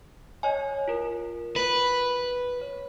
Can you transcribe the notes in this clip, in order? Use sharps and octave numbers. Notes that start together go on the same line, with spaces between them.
C#5 D#5 G#5
F4 A#4
B4
C#5